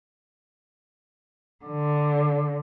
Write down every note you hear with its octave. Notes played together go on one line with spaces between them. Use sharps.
D3